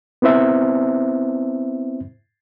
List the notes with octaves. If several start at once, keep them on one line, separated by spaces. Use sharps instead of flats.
B3 C4 E4 C5 E5